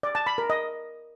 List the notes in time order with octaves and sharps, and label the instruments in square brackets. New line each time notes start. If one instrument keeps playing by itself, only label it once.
[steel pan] D5
A5
B5
A#4
D#5